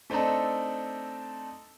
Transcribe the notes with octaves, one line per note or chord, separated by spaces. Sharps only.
A3 C4 D4 D#4 A4